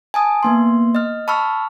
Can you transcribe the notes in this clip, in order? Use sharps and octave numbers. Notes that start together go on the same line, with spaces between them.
G#5 A5 D#6
A#3 B3 C6
D#5 F6
A5 B5 C#6 E6 F6